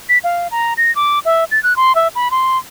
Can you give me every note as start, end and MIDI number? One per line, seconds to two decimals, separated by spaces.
0.09 0.18 95
0.24 0.48 77
0.51 0.74 82
0.77 0.94 94
0.96 1.19 86
1.25 1.44 76
1.51 1.62 93
1.63 1.76 90
1.76 1.95 84
1.95 2.08 76
2.15 2.31 83
2.31 2.58 84